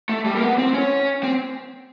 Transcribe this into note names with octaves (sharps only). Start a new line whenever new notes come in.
A3
G3
A#3
B3
C4
C#4
C4